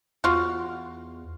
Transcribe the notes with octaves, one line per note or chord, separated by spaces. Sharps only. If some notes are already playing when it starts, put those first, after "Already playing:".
E2 F4 F#4